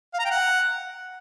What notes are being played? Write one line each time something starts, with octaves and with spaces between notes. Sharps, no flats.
F5
A#5
G5
F#5